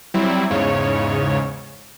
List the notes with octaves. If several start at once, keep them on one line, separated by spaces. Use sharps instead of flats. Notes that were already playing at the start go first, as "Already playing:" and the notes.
F#3 G3 C4 E4
E2 G#2 C#3 C#5